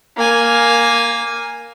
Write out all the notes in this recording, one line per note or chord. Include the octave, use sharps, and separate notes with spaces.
A#3 G#5